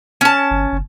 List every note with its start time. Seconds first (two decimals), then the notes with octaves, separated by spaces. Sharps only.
0.21 C#4 A5
0.51 G1
0.72 F#1